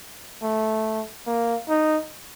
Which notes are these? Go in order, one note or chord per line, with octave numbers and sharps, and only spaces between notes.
A3
A#3
D#4